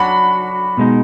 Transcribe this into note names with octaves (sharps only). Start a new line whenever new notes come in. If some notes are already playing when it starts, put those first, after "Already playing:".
Already playing: F#3 D4 F#4 B5
B2 G#3 D#4